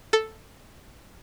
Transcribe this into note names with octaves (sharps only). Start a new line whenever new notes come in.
A4